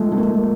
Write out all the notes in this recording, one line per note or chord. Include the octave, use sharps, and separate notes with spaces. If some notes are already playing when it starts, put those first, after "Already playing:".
Already playing: F3 G#3 A3
A3
A#3